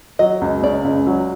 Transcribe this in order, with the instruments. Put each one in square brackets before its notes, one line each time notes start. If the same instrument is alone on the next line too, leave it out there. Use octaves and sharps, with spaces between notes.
[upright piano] F#3 [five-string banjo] D#5
[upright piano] C#2
[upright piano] C#3 [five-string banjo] D5
[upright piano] C#2
F#3